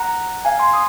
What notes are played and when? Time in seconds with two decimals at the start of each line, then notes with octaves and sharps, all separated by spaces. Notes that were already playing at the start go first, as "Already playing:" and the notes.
Already playing: F#5 A#5
0.45 F5 G#5
0.59 G#5 C6
0.73 D#6